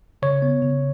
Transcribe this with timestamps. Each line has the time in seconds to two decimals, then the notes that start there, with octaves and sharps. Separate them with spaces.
0.22 C#3 C#5
0.42 B3
0.62 C#3